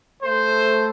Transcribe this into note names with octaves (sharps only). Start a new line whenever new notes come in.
A3 C5